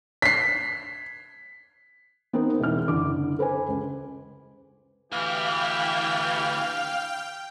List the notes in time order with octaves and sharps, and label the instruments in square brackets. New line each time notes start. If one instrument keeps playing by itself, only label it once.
[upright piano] B6 C7
[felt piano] B3 C4 D#4 A#4
E1 E2 E4 F6
F#1 D3 D6
A4 B4 C5 G#5
C#2
[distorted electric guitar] D2 E4 [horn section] E3 G4 [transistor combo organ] F5 [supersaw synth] G5